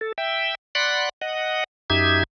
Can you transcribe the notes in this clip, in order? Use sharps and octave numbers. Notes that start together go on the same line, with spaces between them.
A4
E5 G5
D5 F#5 B5 C6 F#6
D#5 F#5
F#2 D#4 G4 E5 G#6